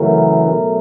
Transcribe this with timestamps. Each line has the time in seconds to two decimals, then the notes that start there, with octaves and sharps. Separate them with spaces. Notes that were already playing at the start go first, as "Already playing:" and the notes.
Already playing: F#2 C#3 E3 A3 A#4
0.48 B2 F#3 A3